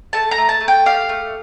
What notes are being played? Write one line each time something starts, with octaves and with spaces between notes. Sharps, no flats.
A3 A5
A#5
A3
A5
A3
G5
G4 F5
A3